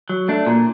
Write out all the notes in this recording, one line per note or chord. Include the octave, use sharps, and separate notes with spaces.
F#3
A3 D4
A#2